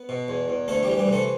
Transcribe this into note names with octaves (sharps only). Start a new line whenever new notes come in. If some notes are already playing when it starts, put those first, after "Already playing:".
Already playing: B3 B4
B2
E2
E2
D2 A3 A4
E3 G3 G4
G3 G4
C3 A3 A4